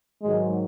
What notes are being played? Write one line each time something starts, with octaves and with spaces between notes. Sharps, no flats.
G#2 D#3 F#3 G#3